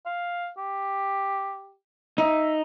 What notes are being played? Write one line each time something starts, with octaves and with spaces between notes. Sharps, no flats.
F5
G4
D#4 E5